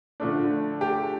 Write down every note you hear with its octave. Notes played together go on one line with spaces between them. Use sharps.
D3 F3 A3 D4
G4